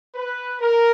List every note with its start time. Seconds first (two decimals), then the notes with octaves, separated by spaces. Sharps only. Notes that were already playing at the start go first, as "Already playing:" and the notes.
0.15 B4
0.61 A#4